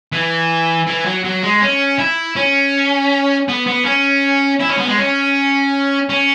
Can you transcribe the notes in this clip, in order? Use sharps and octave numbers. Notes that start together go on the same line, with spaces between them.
E3
E3
F#3
F#3
G#3
C#4
E4
C#4
B3
B3
C#4
E4
C#4
B3
G#3
C#4
C#4